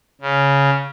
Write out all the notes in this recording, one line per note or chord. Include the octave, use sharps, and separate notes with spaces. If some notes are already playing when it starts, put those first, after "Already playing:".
C#3